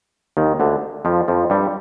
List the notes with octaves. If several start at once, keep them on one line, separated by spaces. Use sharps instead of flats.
D#2 D#3
D2 D3
F2 F3
F2 F3
G2 G3